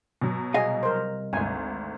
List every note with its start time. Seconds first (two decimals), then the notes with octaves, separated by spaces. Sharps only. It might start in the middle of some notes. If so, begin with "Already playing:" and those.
0.21 B2 F#3
0.54 C2 G#4 D#5 F5
0.83 A#4 C5
1.33 G#1 D2 G#5